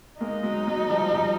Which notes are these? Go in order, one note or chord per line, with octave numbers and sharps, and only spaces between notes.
G#3 A#3 D#4
F#3 G#3
F#3 G#3
F3 G3
F3 G3